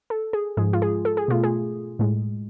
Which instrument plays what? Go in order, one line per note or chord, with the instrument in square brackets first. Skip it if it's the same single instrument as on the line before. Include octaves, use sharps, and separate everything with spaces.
[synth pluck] A4
G#4
G#2 F3 G#3 G#4
F4
G#4
A4
G#4
B2 A3 F4
G#4
A2 G#3